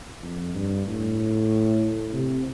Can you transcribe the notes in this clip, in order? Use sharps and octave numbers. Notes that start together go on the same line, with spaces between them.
F2
G2
A2
C3